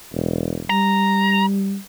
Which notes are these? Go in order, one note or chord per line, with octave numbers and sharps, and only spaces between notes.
E1
G3 A#5